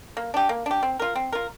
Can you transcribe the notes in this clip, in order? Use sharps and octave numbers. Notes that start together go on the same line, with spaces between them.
A#3
D4 G4
A#3
D4 G4
C4
F4 A#4
C4
F4 A#4